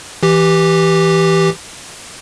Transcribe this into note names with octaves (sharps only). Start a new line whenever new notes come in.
E3 G4